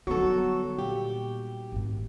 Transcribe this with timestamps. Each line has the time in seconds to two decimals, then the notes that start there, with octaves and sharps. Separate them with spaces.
0.07 D3 F#3 G3 B3 D#4 F#4 A4 C#6
0.79 A#2 G4
1.72 G#1 A2